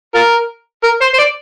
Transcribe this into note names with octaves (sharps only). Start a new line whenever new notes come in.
F4 A#4
A#4
C5
C5
D5